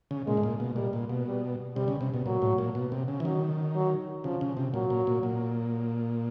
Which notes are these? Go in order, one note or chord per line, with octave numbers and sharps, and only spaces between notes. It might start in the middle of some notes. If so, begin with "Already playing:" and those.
C#3
A#2 G#3
A2
A#2
B2
A#2 G3
A#2
B2
G3
C3 G3
C#3
C3
B2
A#2 F#3
A2
A#2
B2
C3
C#3
E3
D#3 F#3
F#3
C#3 F3
C#3
C3
A#2 F#3
A#2
A#2
A#2